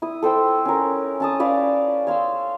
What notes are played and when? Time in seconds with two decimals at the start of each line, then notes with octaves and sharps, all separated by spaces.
0.02 E4 D#6
0.22 A4 C5 G5 B5
0.65 C#4 A#4
1.20 C#4 A5 D#6
1.39 C#4 B4 D5 F5
2.07 C#5 F5 C6 E6